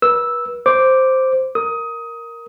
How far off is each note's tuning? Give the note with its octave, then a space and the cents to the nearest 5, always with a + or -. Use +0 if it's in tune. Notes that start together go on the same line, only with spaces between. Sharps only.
B4 -40 E6 -5
C5 +0 D6 +0
A#4 +0 D#6 +20